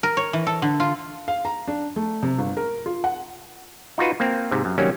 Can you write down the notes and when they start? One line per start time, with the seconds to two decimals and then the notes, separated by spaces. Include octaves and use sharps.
0.03 A#4
0.17 C#5
0.33 E3
0.47 A4
0.62 D3
0.80 F4
1.28 F5
1.45 A#5
1.68 D4
1.96 A3
2.23 C3
2.38 G1
2.57 A#4
2.86 F4
3.04 F#5
3.98 D#4 F4 F#4 B4
4.20 A#3 C4
4.51 G#2 C3
4.65 F#2
4.78 C3 D#3 F#3 G3 A#3 C#4